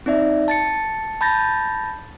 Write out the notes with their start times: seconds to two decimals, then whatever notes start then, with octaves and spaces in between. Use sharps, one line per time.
0.06 C4 D#4 D5 E5
0.48 A5 A6 C#7
1.21 A5 B5 G6 A6 A#6